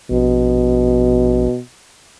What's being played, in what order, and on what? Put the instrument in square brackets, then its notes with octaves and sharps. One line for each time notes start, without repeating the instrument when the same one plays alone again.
[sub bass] A#1 [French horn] B2